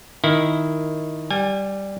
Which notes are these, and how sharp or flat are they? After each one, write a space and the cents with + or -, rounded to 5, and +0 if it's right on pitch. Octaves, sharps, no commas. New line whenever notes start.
D#3 +0 E4 +0
G3 +0 G#5 -35